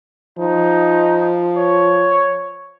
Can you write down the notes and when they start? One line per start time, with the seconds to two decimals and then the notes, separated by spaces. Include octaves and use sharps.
0.39 F3 D#4
1.57 C#5